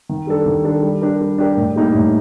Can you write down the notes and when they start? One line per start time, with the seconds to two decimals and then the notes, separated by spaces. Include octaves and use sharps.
0.09 D#3
0.27 G3 D4 A4
0.46 D#3
0.64 G3 D4 A4
0.83 G3
1.02 D4 G4 A#4
1.21 G3
1.38 D4 G4 A#4
1.57 A2
1.76 G3 A#3 D#4 G4
1.94 A2